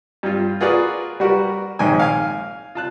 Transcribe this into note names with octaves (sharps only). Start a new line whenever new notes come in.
G2 F4
F4 F#4 G#4 A#4 B4 D5
G3 F#4 A#4 B4
A#1 G#2 D#3 G5 G#5
F5 G#5
F4 A5 F#6